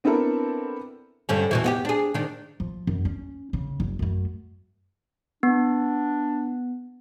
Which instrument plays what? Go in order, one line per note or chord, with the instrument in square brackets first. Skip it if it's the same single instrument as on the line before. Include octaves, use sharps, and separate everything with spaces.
[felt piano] B3 C4 D4 E4 A4 A#4
[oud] G2 D3 C#4
E2 B2 E3
B3 D#4 G4
D4 G#4
D#3 D4
[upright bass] F3
F#2
C#4
C#3
F#1
F#2 A3
[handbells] B3 [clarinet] D4